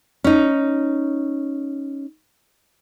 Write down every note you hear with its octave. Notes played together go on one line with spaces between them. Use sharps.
C#4 D#4